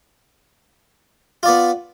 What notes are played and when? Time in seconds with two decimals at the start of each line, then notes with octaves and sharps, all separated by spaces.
1.43 F4
1.46 D5
1.48 B3